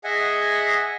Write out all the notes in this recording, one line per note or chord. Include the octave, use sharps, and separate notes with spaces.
G#4 D#5 E5 F#5 G#5